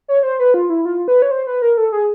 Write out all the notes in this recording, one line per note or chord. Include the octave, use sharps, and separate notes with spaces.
C#5
C5
B4
F4
E4
F4
B4
C#5
C5
B4
A#4
A4
G#4